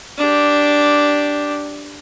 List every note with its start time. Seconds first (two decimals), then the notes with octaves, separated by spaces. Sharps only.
0.18 D4 G4